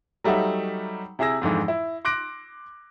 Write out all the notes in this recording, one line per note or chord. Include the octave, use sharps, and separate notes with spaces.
F#3 G3 A3 D#4 E5 F#5
C3 E4 G#4 E6 A#6
F2 G#2 D3 E3
E4
C6 D6 F#6 A#6 D7